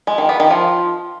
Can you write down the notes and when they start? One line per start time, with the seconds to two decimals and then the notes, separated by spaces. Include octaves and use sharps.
0.07 G#3
0.18 D#3
0.29 B3
0.40 D#3
0.51 F3